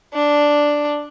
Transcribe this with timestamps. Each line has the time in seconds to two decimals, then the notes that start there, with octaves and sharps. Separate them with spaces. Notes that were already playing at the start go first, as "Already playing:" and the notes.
0.13 D4